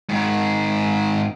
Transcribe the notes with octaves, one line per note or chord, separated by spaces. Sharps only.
G#2 D#3